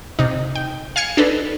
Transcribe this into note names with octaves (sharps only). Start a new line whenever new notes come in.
C3 D#4
G5
F5 G#5 F6 G#6 C#7
D4 D#4 A4 B4